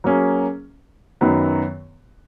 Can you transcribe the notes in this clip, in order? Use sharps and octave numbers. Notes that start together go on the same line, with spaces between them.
F#3 A#3 C#4 G#4
F#2 D#3 F#3 B3